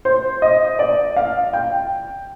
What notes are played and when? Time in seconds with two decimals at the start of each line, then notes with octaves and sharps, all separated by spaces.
0.05 C5
0.42 D#5
0.79 D5
1.16 F5
1.53 G5